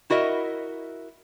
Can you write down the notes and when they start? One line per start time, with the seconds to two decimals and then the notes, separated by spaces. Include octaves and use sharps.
0.10 E4 F#4 A#4 D#5 E5